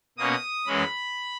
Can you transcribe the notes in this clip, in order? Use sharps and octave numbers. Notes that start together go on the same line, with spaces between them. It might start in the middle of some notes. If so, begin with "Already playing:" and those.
B2 A#3 C#4 D#6
F#2 E3 G#3 C#4 B5